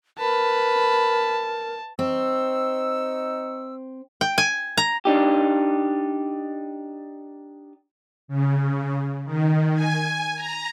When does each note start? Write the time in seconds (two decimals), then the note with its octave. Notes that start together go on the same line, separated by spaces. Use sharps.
0.19 A#4 B4 A5 B5
1.99 C4 D#4 C#6 E6
4.21 G5
4.38 G#5
4.77 A#5
5.05 D4 D#4 G4
8.28 C#3
9.24 D#3
9.74 G#5
10.35 A#5